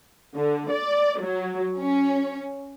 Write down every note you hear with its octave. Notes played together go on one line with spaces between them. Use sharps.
D3
D5
F#3
C#4